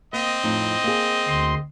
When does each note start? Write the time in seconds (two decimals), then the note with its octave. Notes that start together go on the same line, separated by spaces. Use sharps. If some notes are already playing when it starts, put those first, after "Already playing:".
0.13 A#3 C4 D#5
0.44 F2 A2 D#4
0.84 A#3 G#4
1.29 D2 C6